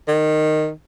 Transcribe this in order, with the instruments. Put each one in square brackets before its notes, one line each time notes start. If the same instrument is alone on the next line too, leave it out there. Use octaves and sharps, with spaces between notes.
[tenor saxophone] D#3